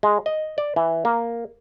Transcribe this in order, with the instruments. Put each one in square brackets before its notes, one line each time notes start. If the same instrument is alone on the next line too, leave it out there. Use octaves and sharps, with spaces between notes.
[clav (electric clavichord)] G#3
D#5
D5
E3
A#3